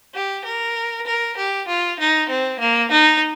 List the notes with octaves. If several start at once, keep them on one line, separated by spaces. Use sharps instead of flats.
G4
A#4
A#4
G4
F4
D#4
C4
A#3
D#4